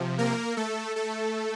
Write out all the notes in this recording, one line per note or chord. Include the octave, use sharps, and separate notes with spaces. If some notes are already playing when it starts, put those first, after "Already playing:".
Already playing: C3 F3
A#3 A#4
A3 A4
A3 A4